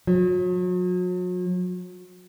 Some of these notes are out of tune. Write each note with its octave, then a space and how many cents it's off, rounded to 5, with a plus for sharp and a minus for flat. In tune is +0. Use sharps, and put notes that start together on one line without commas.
F#3 -40